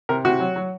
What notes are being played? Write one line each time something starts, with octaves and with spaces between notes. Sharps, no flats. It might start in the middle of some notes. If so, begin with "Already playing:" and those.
C3 A#4
C3 F#4
F#3
F#3